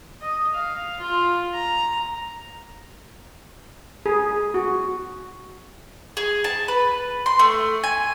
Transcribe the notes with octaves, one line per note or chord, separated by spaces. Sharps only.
D#5
F5
F4
A#5
G#4
F#4
G#4
A5
B4
C6
A3
G#5